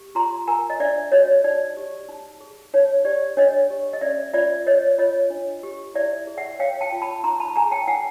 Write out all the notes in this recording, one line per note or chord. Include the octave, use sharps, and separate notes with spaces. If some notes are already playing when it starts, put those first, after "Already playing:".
Already playing: G4
F4 A#5 C6
A#4 G#5 A#5
D#5
D4 D5 E5
F#4 C#5 D#5
D#4 D5
G4
D#4
G#4
D#4 C#5
G4 D5
D4 C#5 D#5
G4
D#5
C#4 D5 E5
F4 D5 E5
C5 C#5 D#5
F4 C#5 D#5
D4
G4
E4 D5 E5
G#4
E5 F#5
C#5 F5 G5
G5 A5
F4
A5 B5
D#4 A#5 C6
A5 B5
G#4 G#5 A#5
G5 A5
D#4 F#5 G#5